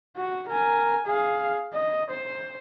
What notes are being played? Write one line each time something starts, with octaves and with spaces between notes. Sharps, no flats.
F#4
A#4 G#5
G#4 F5
D#5
C5